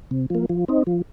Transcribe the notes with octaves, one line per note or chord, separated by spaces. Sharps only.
C3
F3 A#3
F3
C4 D#4
F3